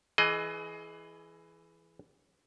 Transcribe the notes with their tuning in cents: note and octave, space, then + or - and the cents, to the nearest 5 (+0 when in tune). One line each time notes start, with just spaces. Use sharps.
E3 +10 G#4 +30 D#5 +0